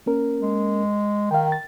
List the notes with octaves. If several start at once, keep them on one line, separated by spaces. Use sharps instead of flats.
A#3 C#4 A#4
G#3
D#3 F5 G5
A6